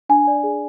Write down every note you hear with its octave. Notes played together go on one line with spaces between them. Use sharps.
D4 G#5
D5
G#4